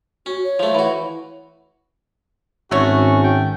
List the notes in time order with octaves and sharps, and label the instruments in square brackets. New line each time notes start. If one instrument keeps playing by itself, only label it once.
[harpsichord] C#4 [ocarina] F#4
[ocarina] C#5
[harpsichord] F3 A3
E3 F#4
[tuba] G#1 [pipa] A3 C#5 [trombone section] C#4 [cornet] F#4
[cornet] G5